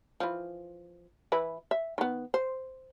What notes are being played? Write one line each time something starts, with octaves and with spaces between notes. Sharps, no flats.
E3 F3
E3 E4 B4
E5
D#3 B3
C5